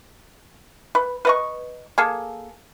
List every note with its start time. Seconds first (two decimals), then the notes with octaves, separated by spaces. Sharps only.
0.95 B4
1.25 B4 D#5 C#6
1.98 A#3 G#4 A4